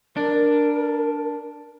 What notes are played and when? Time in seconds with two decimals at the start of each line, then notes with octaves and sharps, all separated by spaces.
0.17 D4 A#4